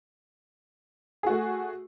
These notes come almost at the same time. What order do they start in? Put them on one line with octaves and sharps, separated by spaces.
G#4 F#4 A3